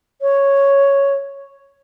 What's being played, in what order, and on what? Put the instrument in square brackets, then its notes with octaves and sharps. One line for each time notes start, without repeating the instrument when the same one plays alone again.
[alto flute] C#5